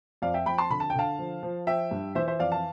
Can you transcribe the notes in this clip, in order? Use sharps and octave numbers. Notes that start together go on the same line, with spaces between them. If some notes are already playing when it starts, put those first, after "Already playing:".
F2 D5 F5
E5 G5
F2 G5 B5
A5 C6
D3 B5
A5
G5
D3 F5 A5
F3
F3
F3 E5 G5
G2
E3 C5 E5
C5 E5
F2 D5 F5
F5 A5